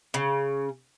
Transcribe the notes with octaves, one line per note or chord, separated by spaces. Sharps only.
C#3